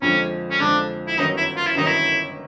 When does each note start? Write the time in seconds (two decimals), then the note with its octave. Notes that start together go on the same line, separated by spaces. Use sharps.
0.02 F2 D3 F3 G#3 C#4
0.51 C#4
0.60 F2 D3 F3 G#3 D4
1.08 E4
1.18 G1 F#2 D#3 F#3 D#4
1.37 E4
1.56 F4
1.67 E4
1.75 G1 F#2 D#3 F#3 D#4
1.86 E4